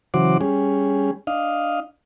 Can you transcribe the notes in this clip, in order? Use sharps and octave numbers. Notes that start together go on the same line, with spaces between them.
C#3 E3 F#3 F#4 C5 D6
G3 C#4 G#4
D4 D#5 F5